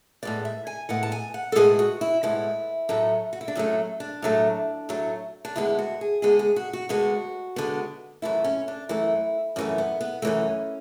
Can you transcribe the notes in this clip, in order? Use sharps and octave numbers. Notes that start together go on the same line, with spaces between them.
A2 G#3 B3 D5
E5
G#5
A2 G#3 B3 F#5
A5
G#5
F#5
A4
A2 G#3 B3 G#4
F#4
E4
A2 G#3 B3 E4
A2 F#3 A3
F#4
E4
D4
A2 F#3 A3 C#4
D4
A2 F#3 A3
A2 F#3 A3
D4
D2 D3 G#3 B3 E4
F#4
G#4
D2 D3 G#3 B3 G#4
G#4
F#4
F#4
D2 D3 G#3 B3 F#4
D2 D3 G#3 B3
F#2 E3 A3 E4
C#4
D4
F#2 E3 A3 E4
F#2 E3 A3 C#4
B3
B3
F#2 E3 A3 C#4